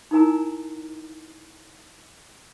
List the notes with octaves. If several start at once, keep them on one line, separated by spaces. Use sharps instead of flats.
D#4 E4 A#4 G#5 A#5